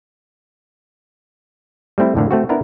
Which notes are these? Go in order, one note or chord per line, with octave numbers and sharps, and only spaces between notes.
G3 A3 C4 E4
F2 A2 D3 A#3
A3 C4 F#4
B3 D4 E4 A#4